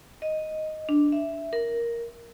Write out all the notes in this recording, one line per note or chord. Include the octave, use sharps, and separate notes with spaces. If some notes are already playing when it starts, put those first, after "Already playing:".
D#5
D4
E5
A#4